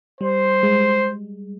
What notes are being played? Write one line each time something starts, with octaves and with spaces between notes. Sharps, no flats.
G3 C5
G#3